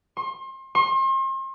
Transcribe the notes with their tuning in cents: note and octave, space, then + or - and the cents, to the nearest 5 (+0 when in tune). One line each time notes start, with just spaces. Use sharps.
C6 +35
C6 +40